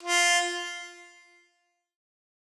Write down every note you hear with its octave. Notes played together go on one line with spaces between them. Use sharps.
F4